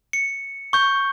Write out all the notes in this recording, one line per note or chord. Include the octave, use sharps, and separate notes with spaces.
C#7
C#6 G6